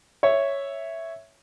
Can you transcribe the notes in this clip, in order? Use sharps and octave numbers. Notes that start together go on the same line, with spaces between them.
C#5 E5